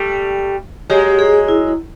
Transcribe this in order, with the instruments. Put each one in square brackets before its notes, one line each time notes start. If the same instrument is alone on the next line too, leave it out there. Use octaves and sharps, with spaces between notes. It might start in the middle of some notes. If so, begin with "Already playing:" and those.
Already playing: [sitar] G3 A3
[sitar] F#3 G#3 [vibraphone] G4
[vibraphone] G#4
E4